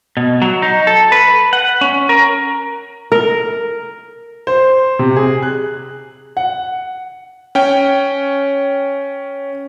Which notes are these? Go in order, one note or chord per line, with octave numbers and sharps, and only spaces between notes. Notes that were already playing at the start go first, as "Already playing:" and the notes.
B2
F#3
D#4
A4
B4
F#5
C#4
A#4
A#4
C5
C3
G#4
F#6
F#5
C#4 G5